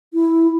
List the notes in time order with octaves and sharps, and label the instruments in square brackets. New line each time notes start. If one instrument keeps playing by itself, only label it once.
[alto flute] E4